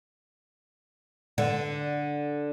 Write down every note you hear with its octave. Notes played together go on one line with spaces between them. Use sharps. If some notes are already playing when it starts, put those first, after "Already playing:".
D3